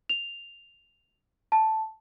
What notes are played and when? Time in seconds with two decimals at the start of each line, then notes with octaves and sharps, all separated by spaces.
0.09 F7
1.52 A5